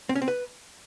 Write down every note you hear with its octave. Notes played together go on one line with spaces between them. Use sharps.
C4
C#4
C4
B4